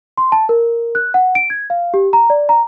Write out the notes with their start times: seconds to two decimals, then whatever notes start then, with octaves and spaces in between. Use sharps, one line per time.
0.18 C6
0.32 A5
0.49 A#4
0.95 F#6
1.14 F#5
1.35 D7
1.50 G#6
1.70 F5
1.94 G4
2.13 A#5
2.30 D5
2.49 A#5